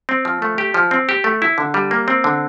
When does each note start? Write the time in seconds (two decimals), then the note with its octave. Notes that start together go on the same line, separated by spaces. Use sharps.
0.09 C4
0.25 F3
0.42 A3
0.58 G4
0.74 F3
0.91 C4
1.09 G4
1.24 A3
1.42 E4
1.58 D3
1.74 G3
1.91 A#3
2.08 C4
2.24 D3